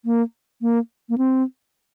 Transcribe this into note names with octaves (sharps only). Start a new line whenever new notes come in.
A#3
A#3
A#3
C4